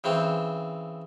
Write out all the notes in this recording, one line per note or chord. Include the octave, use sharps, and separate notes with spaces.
C#3 E3 C4